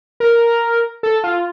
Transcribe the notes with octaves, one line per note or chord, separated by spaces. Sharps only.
A#4
A4
F4